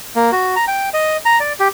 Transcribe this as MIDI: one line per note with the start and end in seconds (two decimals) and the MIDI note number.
0.16 0.31 58
0.32 0.55 66
0.56 0.65 82
0.68 0.89 79
0.94 1.17 75
1.25 1.39 82
1.40 1.53 74
1.60 1.68 67